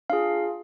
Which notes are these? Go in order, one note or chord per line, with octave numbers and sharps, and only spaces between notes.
D4 F4 G#4 F5